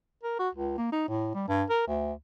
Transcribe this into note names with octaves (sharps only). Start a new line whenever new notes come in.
A#4
F#4
C#2
A#3
D#4
A2
G3
G2
A#4
D2